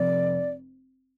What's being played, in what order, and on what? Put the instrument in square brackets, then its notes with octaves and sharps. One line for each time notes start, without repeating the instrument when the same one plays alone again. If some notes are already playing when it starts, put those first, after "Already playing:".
Already playing: [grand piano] F1 F2 [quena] D5